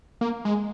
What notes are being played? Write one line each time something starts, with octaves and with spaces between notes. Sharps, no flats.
A#3
G#3